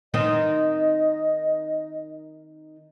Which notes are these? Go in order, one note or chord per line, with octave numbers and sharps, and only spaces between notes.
D#3 C4 D#4 D#5